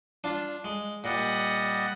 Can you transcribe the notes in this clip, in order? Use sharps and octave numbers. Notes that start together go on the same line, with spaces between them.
D4 F4
G#3
A#2 G3 D#5 F#5